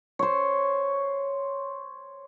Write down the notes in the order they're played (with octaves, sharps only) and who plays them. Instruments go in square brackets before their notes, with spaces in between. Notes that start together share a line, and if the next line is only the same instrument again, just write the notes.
[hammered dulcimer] C5 C#5